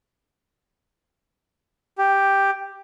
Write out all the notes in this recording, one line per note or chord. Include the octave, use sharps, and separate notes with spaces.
G4